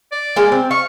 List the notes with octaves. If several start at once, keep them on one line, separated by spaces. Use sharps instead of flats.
D5
G#3 A#3
C4
F5 C#6